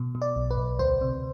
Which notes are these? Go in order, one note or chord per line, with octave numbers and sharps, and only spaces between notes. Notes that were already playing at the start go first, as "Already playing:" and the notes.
Already playing: B2
B2
D5
B1
B4
B1
D2 C5
C3